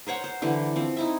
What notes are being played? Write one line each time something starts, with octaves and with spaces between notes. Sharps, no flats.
A#4 C5 C#5 F#5
C5
D3 E3 G3
F3 C4
D#4 E4 E5